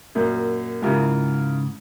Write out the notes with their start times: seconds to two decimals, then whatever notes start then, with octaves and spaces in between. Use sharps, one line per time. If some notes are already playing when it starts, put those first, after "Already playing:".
0.15 F#2 A#2
0.82 G#2 C#3 E4 F4 A#4